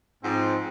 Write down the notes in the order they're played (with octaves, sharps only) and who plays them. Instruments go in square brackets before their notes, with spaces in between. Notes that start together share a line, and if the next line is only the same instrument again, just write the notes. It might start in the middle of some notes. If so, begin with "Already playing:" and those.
[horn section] G#2 F3 C4